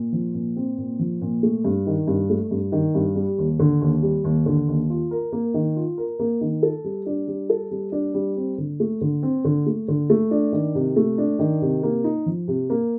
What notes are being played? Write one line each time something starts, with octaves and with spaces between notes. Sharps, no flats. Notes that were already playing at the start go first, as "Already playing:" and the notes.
Already playing: A#2
F3
A#2
C4
A#2
F3
A#2
A3
G2
D#3
G2
A3
G2
D#3
G2
G3
D#2
D3
D#2
G3
D#2
D3
D#2
F4
A#4
A#3
D#3
F4
A#4
A#3
D#3
A4
G3
D4
G3
A4
G3
D4
G3
C4
D3
A3
D3
C4
D3
A3
D3
A3
D4
D#3
C3
A3
D4
D#3
C3
A#3
D#4
F3
C3
A#3